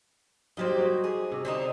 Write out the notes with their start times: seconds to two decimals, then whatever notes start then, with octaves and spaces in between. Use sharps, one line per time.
0.57 F#3 G3 A#3 D#4 G4 C5
0.78 D#4 F#4
1.04 G#4
1.31 C3 C#4
1.45 D3 C4 D#4 C5